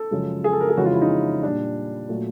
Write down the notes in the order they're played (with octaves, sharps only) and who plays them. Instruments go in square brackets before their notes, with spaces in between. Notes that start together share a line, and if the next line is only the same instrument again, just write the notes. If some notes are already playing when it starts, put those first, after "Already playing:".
Already playing: [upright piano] A4
F#2 C#3 F3 G#3
G#4
A4
A#4
G#4
F2 C#3 E3 G#3 F#4
F4
E4
D#4
A#2 G3 D4
A#2 F#3 A3